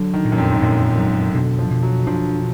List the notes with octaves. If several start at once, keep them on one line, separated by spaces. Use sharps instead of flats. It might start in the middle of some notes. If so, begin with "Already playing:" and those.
Already playing: D3 F#3
D#3
A#2
F#2
F2
G#2
F#2 A#2
G#2 F#3
B2 D3
F3
B2
F#3
F3 D4